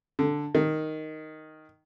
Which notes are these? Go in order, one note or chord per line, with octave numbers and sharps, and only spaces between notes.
D3
D#3